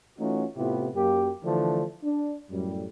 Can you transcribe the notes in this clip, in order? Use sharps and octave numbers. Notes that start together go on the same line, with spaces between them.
E3 A3 C#4 D#4 F4 F#4
A2 C3 B3 E4 F4 G4
F#2 A#3 G4
D3 E3 F3 A3 D4
D4
F#2 A2 G3